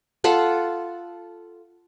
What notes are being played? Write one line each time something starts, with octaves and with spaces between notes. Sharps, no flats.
F4 A4 F#5